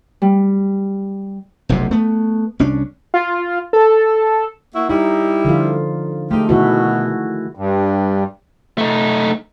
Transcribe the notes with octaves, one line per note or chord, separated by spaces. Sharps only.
G3
F1 B1 F2 C3
A3 B3
C2 C#4 D4
F4
A4
A#3 E4 F#4
G3 D#4 E4
D3 F3 F4
G#3 A3 D#4 F4 G4
B2 D#3 E4 F#4
G2
A3 D#4